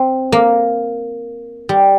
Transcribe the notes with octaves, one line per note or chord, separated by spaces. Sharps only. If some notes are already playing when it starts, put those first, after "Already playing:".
Already playing: C4
A#3
G3